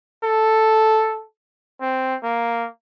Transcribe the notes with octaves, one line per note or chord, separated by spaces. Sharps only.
A4
C4
A#3